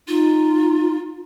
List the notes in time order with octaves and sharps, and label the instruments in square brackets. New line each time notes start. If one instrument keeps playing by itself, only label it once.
[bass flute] D#4 [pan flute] F4